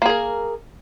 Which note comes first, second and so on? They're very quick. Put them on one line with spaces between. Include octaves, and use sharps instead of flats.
A#3 G#4 A#4